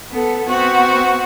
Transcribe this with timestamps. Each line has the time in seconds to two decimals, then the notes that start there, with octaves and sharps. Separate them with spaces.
0.11 B3 A4
0.49 B3 C4 F#4